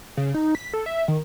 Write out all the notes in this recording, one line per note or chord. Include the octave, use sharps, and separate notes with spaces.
C#3
D#4
B6
A4
E5
D#3